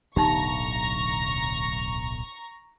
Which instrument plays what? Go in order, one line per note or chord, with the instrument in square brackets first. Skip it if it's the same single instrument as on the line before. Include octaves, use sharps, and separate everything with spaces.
[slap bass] D1 B1 D3 [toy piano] D#4 G4 [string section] A#5 C#6